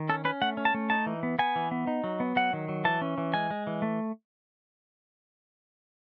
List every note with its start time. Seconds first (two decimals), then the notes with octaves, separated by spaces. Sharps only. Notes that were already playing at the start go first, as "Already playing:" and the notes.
Already playing: D#3
0.09 C#4 A4
0.25 C#4 B4
0.42 A3 F#5
0.57 C#4
0.65 A5
0.74 A3
0.90 D#4 A5
1.06 E3
1.23 B3
1.39 B3 G#5
1.56 E3
1.71 B3
1.87 D#4
2.04 F#3
2.20 B3
2.36 F#3 F#5
2.53 D#3
2.68 F#3
2.84 E3 A5
3.02 C#4
3.18 E3
3.34 G#3 G#5
3.51 G#3
3.67 E3
3.82 A3